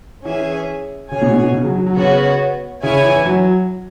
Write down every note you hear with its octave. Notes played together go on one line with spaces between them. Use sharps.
E3 C#4 G#4 E5 G#5
C#3 G#4 C#5 G#5
B2
B2
B2
C#3
F#3
F#3
F#3
C#3 B3 F#4 C#5
C#3 E4 C#5 G#5
E3
E3
F#3